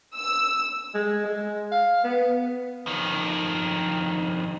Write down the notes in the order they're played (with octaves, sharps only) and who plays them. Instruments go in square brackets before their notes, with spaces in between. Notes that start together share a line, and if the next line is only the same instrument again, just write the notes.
[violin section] E6
[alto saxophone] G#3
G#3
F5
B3
[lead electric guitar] F2 D#3